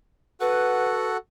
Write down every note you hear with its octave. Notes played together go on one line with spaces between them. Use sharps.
F#4 A4 B4 F#5